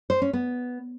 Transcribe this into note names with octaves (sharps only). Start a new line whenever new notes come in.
C5
C#4
B3